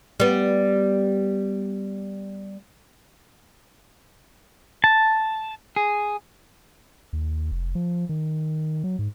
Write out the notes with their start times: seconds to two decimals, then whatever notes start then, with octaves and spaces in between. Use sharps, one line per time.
0.20 G3 B3
4.84 A5
5.76 G#4
7.13 D#2
7.51 F1
7.75 F3
8.09 D#3
8.84 F#3
8.99 G#2